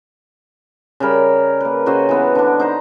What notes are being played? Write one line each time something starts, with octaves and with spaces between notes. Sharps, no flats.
C#3 G3 A#4 B5
A#3 B4
C#3 F#4 C5 D#5
E3 B3 B4
D3 D4
D#4 C5 A#5